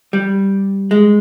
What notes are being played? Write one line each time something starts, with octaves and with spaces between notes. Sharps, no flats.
G3
G#3